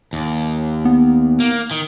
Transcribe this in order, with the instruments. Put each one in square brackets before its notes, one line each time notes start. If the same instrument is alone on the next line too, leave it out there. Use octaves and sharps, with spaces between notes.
[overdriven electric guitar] D#2
[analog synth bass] B3
[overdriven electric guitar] A#3
D#3